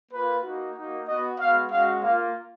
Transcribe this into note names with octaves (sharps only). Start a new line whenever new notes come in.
A#3 F4 B4
A#3 D#4 F#4
A#3 D#4 F#4
B3 F#4 D#5
G#3 B3 F#4 F5
G#3 C#4 F#4 F5
A#3 F4 F5